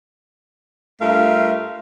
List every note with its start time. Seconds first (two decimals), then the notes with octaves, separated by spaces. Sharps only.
1.02 G2 A3 F4 A#4 E5 F5